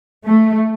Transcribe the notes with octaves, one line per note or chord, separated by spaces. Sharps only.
A3